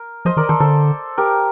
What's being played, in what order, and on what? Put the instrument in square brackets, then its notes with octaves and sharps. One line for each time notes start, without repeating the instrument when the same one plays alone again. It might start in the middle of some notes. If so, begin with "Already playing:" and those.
Already playing: [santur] A#4
[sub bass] F3 [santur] C5 D#5
[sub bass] D#3 [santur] A#4 D5
[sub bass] D#3 [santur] A4 C5
[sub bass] D3 [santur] A4 C5
[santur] G4 A#4